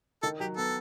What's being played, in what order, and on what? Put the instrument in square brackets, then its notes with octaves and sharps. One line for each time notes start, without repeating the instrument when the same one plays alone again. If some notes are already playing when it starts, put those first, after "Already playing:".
[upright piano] D#3 [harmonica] A4
[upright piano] F#3 [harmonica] G4
[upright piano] B3 [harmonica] A4